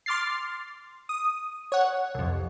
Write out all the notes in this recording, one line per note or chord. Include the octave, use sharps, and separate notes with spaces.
C6 D6 F6 A6 C7
D#6
C#5 F#5
C2 F2